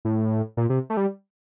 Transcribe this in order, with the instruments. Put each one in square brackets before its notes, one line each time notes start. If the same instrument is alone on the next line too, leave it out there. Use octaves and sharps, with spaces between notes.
[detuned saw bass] A2
A#2
C3
A3
G3